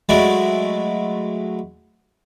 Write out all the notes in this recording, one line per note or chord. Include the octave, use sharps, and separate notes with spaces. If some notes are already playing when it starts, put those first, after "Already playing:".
F#3 G#3 A3 E4 D5